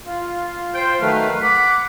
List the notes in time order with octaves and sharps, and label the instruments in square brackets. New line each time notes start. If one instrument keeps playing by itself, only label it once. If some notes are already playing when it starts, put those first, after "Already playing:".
[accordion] F4
[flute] C5 [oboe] G5
[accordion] D#3 F#3 A3 [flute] B4 [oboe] F5
[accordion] F#5 [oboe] B5 [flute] D6